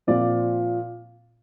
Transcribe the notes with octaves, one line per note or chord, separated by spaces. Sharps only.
A#2 F3 C4 D5